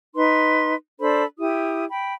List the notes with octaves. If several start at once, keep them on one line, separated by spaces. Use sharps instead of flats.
D#4 B4 C6
D4 A4 C5 B5
E4 G4 D#6
G5 B5